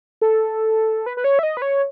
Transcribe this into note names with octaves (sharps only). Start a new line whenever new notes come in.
A4
B4
B4
C#5
E5
D#5
B4
C#5